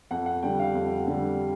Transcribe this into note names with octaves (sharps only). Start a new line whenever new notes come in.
F2 F#5
F#5
D3 G3 G5
F5
F2
D3 G3